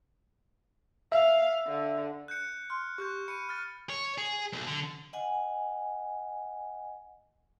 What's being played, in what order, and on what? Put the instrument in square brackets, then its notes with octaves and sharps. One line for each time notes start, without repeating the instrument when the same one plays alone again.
[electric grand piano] E5 [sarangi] F5
[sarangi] D3
[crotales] F#6 G6 C#7
[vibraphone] C6 [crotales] F6
[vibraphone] G4 [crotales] C#6 F#6 G6
[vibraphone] B5 [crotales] C#7 D#7
[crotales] F6 A6
[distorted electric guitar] C#5
G#4
B1
D3
[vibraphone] D#5 F#5 G#5